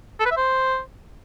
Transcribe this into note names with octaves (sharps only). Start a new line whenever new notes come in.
A4
B4
E5
C5